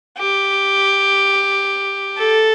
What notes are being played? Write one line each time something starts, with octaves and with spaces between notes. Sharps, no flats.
G4
A4